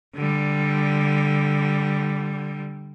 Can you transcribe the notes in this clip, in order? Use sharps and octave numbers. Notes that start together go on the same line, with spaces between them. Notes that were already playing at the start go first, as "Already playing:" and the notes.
D3 G3